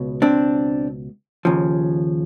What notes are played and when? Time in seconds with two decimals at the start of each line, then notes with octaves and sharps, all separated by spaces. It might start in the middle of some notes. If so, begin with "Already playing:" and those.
Already playing: C#2 B2
0.22 C4 D4
1.45 D#2 C#3 F3